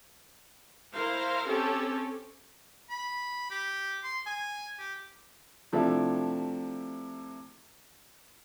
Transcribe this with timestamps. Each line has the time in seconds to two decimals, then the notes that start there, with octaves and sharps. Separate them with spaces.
0.94 E4 A#4 C5 F5
1.48 C4 C#4 G4 A4
2.90 B5
3.50 G4
4.03 C6
4.26 G#5
4.79 G4
5.72 C3 F3 A3 D4 E4 A4